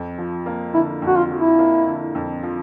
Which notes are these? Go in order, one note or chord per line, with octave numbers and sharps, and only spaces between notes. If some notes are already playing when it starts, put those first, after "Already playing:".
Already playing: F2
F3
A#3
D3 E4
F2
F#4
F4
F3
E4
A#3
D3
F2
F3